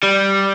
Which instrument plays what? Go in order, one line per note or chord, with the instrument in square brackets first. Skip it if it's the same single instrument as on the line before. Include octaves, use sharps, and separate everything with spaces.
[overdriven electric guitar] G3